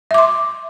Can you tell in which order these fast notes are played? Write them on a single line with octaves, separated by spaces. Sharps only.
E5 D6 C6